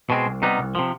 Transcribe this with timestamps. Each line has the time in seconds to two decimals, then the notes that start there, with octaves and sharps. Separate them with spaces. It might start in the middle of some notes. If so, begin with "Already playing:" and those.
0.10 B2 G#3 C4
0.26 C2
0.42 C3 G3 B3 D#4
0.59 C2
0.75 C3 F3